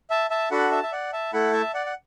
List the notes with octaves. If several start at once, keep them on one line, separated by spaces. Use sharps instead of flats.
E5 A5
E5 A5
D4 F#4 A4 F#5 B5
E5 A5
E5
D5 F#5
E5 A5
A3 E4 A4 F#5 B5
E5 A5
D5 F#5
F#5